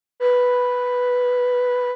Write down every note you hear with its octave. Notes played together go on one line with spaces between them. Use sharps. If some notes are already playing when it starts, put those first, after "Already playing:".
B4